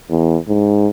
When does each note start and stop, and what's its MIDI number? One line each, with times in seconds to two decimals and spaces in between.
0.10 0.37 40
0.48 0.89 44